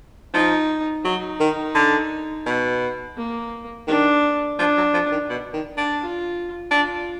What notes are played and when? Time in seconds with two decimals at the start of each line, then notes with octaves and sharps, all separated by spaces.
0.33 F3 D#4
1.05 F#3 D#4
1.40 D#3
1.75 D3
2.46 B2
3.17 A#3
3.87 D#3 D4
4.59 F3 D4
4.77 F#3
4.94 F3
5.12 D#3
5.30 B2
5.54 D#3
5.77 D4
6.01 F4
6.71 D4 F4